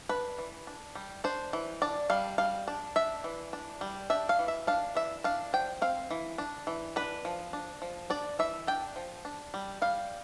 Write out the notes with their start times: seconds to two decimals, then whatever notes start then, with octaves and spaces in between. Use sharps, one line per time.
0.09 D4 B4
0.38 E3
0.67 D4
0.95 G3
1.24 D4 C5
1.53 E3
1.82 D4 D5
2.10 G3 F5
2.38 G3 F5
2.68 D4
2.96 D4 E5
3.24 E3
3.53 D4
3.81 G3
4.10 D4 E5
4.29 F5
4.39 E3
4.48 E5
4.67 D4 F5
4.95 E3 E5
5.24 D4 F5
5.53 F3 G5
5.82 C4 F5
6.10 E3
6.38 D4
6.67 E3
6.96 D4 B4
7.25 F3
7.53 D4
7.82 F3
8.10 D4 D5
8.39 E3 E5
8.67 D4 G5
8.96 F3
9.25 D4
9.54 G3
9.82 G3 F5